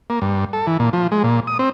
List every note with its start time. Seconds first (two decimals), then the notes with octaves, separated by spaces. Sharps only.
0.10 A#3
0.22 G2
0.53 A4
0.67 E3
0.80 A#2
0.93 F3
1.12 G#3
1.24 A#2
1.47 D#6
1.59 C4